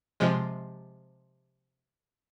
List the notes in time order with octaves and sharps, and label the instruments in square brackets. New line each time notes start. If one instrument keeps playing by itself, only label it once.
[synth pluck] C3 F3 G#3